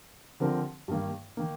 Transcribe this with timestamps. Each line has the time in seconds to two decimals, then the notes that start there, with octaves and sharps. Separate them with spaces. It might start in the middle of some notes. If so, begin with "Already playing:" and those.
0.40 D3 F3 C4 G4 A#4
0.88 G2 D#3 A#3
1.37 D#3 A#3